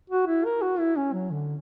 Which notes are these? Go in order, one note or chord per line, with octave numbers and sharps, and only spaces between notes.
F#4
E4
A#4
F#4
E4
C#4
F#3
D3